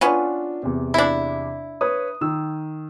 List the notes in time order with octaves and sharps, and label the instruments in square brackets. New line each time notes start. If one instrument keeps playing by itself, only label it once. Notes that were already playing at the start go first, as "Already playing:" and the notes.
[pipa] B3 C#4 [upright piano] D4 F4
[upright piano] E2 C3
[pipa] D4 E4
[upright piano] B4 C#5 D#6
D#3 E6